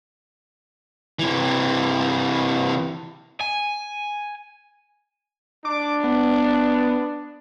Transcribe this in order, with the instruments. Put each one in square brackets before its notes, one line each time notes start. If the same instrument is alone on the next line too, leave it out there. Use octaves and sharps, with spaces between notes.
[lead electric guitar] C3 E3
[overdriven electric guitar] G#5
[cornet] D4 [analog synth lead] D6
[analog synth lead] B3